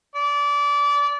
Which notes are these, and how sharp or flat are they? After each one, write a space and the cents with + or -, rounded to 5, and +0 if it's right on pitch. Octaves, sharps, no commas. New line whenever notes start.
D5 -25